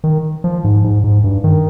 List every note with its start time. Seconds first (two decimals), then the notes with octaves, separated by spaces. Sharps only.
0.04 D#3
0.44 F3
0.64 G#2
0.84 G#2
1.04 G#2
1.24 G2
1.44 D#3